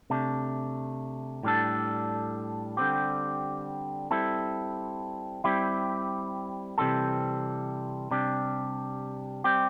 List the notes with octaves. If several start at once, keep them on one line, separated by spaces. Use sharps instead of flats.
C3 A3 D4
A2 G3 D4 A4
D3 G3 C4 G4
G3 C4 E4 A4
G3 C4 E4 G4
C3 E3 G3 C4 A4
C3 G3 D4 G4
G3 C4 G4